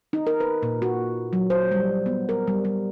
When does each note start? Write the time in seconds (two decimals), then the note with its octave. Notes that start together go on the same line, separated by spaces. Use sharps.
0.13 D#4
0.27 A#4
0.40 B4
0.63 A#2
0.82 F#4
1.33 F#3
1.50 C5
1.72 G3
2.06 B3
2.29 A#4
2.48 G3
2.65 G3